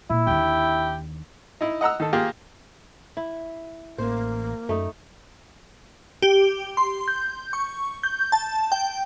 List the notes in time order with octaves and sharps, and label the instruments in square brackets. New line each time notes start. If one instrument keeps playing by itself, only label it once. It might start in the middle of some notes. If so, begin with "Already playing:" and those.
[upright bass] A#2 [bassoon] E4
[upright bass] D#2 D3 [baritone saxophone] G4
[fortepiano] D#4 E4
D#5 F#5 A#5 E6
D#3 A4
A#3 F4 G4 G#4
[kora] E4
[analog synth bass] A1 [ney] A#3 [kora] C5
[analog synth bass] F#2 [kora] A3 D#4
[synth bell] G4
C6
G6
C#6
G6
A5
G5